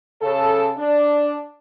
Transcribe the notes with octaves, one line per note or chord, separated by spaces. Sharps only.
C#3 A4
D4